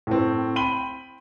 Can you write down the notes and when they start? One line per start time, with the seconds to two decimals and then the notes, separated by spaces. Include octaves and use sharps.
0.07 A2 C4
0.56 G5 B5 C6 D#7 F#7 G7